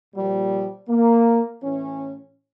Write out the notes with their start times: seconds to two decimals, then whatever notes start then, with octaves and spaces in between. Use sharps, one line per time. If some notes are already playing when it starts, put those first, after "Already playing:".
0.14 A#2 F3 G3
0.89 A#3
1.63 A2 E3 C#4